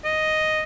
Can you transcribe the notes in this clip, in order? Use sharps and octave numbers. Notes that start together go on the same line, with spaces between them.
D#5